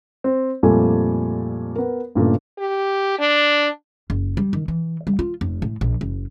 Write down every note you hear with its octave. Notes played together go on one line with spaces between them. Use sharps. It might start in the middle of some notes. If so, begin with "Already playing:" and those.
C4
F2 A#2 G3 A3 A4 G#5
B3 A#4
G2 A#2 C#3 A3
G4
D4
F#1
G3
D#3
E3
G3
F4
F1
A2
A#1
F#1